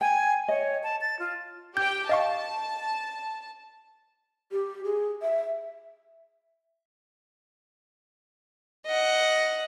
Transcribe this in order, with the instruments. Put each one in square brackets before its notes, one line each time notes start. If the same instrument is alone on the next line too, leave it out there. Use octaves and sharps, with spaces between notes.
[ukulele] G5 [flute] G#5
[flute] C#5 [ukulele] D#5
[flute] A5
A6
F4
[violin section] G4 G5 [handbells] G6
[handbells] D#5 F5 C#6 [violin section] A5
[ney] G4
G#4
E5
[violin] D#5 F#5